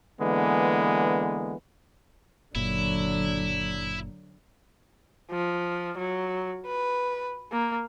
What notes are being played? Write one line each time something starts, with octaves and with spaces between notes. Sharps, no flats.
D3 E3 G#3 A#3 B3
F#1 A#2 D3 F#3 E4
F3
F#3
B4
A#3